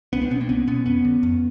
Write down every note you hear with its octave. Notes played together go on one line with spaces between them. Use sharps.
C2 B3 C#4
C4 D4
B2 B3 C#4
A#3 C4
C2 B3 C#4
B2 B3 C#4
F2 B3 C#4
D3
F2